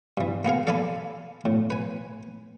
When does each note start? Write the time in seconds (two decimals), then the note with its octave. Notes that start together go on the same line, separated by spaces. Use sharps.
0.17 G2 E3
0.45 A#3 B3 G#4 F5
0.67 A4 D5 F5 G#5 A5 B5
1.45 A2
1.70 B4 G#5